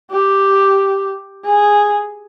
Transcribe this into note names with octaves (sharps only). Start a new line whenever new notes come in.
G4
G#4